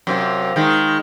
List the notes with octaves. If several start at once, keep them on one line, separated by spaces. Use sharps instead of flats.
F#2 C3 F4
D#3 G#3